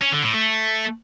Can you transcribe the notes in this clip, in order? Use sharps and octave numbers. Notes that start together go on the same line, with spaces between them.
C#4
D3
A2
A3